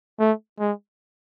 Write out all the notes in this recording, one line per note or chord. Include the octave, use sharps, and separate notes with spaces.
A3
G#3